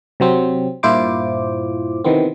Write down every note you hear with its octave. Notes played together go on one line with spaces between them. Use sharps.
C3 F#3 C4
G2 A#2 E4 F4 C5 D6
C3 D#3 E3 B3 C4